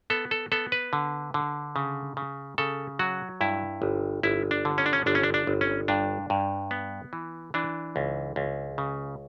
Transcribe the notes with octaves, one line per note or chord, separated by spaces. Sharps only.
B3 A4
A4
B3 A4
B4
D3
D3
C#3
C#3
C#3 A4
F#3 F#4
G2 E4
G1
G1 E4
D4
D3
C#4
D4
C#4
G1 D4
C#4
D4
D4
G1
C#4
G2 D4
G2
B3
E3
E3 D4
C#2
C#2
C#3